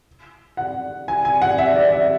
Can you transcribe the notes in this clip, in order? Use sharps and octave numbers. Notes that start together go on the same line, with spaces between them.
F#5
G#5
G#5
F#5
E5
D5
E5